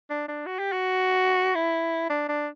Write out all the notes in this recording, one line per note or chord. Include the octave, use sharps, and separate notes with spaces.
D4
D4
F#4
G4
F#4
E4
D4
D4